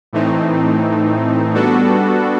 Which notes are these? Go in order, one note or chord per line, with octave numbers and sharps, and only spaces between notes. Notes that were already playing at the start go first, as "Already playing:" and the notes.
A2 E3 A3 C4 D#4
G3 B3 D4 F#4 A4